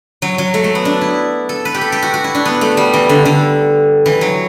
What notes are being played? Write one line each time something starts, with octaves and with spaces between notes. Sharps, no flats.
F#3
F#3
A3
A3
B3
D4
E4
A4
B4
G4
A4
G4
F#4
F#4
E4
D4
B3
A3
G3
E3
D3
D3
E3
F#3